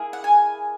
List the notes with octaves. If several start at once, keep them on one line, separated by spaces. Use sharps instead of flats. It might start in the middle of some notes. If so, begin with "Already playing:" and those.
Already playing: A#3 E4 G#4
F#5
G#5